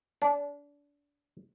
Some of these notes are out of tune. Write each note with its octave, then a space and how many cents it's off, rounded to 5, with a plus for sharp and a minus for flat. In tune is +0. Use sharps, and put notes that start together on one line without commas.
D4 -30